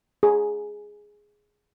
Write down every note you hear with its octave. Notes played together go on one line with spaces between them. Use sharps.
G#4